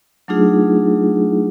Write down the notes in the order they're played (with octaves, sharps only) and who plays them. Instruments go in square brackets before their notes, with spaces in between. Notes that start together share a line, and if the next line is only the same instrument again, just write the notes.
[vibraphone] F#3 A3 D4 D#4 F4 G#4